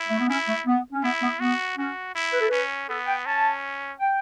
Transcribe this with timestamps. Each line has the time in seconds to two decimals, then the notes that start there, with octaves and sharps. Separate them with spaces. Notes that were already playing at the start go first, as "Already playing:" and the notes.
Already playing: E4
0.09 A3
0.19 B3
0.29 C#4 E4
0.48 A3
0.66 B3
0.92 C#4
1.03 B3 E4
1.22 B3
1.40 B3 F#4
1.78 C#4 F#4
2.15 E4
2.33 B4
2.41 A4
2.48 C#4 B4
2.89 B3 A4
3.07 G5
3.26 C#4 A5
4.00 G5